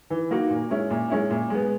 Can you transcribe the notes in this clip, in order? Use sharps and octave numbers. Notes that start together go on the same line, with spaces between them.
E3
A#3 D#4 F#4
A#2
G#3 C#4 E4
A#2
G#3 C#4 E4
A#2
G#3 B3